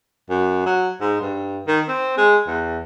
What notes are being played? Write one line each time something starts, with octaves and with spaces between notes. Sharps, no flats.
F#2
F#3
G#2
G2
D#3
C4
G#3
E2